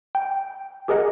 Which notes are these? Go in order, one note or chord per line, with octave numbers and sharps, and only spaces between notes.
G5
G4 G#4 A#4 D5 D#5 F#5